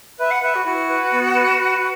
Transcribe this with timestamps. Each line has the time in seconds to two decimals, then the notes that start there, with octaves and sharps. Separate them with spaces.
0.19 B4 E5
0.31 F#5
0.43 B4 E5
0.55 F#4
0.66 E4 F#4
0.89 B4
1.13 B3
1.35 B4
1.58 B4